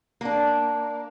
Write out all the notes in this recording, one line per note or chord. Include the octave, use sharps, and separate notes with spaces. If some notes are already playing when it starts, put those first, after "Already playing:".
A#3 D4